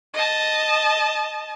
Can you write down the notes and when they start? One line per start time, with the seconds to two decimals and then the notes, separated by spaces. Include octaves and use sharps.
0.13 D#5 A5